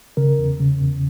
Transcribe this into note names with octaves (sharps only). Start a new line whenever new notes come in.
C#3 A#4
E2
C#3
E2